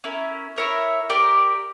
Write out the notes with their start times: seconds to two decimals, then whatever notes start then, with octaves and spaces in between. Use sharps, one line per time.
0.04 C#4 E4 A#4
0.56 E4 A#4 C#5 E5
1.10 G4 A#4 D5